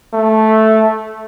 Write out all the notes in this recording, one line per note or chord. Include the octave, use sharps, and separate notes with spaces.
A3